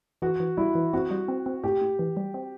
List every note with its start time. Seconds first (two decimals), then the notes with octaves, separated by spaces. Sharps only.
0.22 E3 F#4
0.40 E3
0.57 G3 E4
0.75 E3
0.93 C4 F#4
1.11 G3
1.28 C4
1.46 C4
1.64 A2 G4
1.81 A2
1.99 E3
2.17 G3
2.34 C4